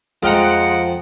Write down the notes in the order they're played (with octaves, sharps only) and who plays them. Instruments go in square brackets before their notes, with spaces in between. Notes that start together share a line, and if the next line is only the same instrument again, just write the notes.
[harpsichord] F2 G5 A#5 [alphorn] F3 [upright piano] G#3 F6 [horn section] D#5 F#5